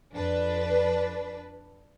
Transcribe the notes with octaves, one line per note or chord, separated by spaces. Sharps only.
F2 D4 B4